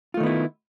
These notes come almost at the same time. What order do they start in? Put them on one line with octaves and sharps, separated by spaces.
F4 A3 D#3 B3 E4